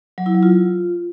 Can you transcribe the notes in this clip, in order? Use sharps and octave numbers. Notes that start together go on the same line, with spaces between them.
F#3
E4
F#3
F4